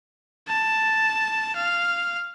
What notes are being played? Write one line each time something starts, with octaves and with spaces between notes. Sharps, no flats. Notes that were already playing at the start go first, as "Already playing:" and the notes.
A5
F5